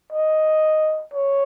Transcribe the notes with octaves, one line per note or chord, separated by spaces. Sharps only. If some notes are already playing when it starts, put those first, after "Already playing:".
D#5
C#5